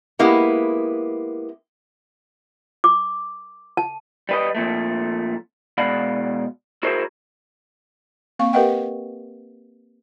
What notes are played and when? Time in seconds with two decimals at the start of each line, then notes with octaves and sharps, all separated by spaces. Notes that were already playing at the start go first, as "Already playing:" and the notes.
0.19 G#3 A#3 B3 E4 G4
2.84 D6
3.77 A5
4.29 G3 B4 D#5
4.55 F2 A#2 A3
5.78 B2 G#3 D5 F5 F#5 B5
6.83 E4 F#4 G#4 A#4 C5 E5
8.39 A#3 C4 F5 C#6
8.53 G4 A#4 B4 D#5 F#5 G5